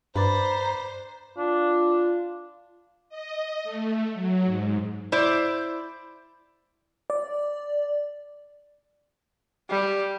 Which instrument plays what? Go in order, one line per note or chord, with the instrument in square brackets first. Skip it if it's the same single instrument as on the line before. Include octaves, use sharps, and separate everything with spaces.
[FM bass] G2 [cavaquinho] B4 D5 [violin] C5 [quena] A#5
[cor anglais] D4 [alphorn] F4
[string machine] D#5
A3
F#3
G#2
[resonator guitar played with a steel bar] E4 C5 D5
[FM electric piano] D5
[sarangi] G3